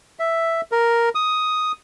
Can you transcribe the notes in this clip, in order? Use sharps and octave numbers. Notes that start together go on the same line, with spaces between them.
E5
A#4
D#6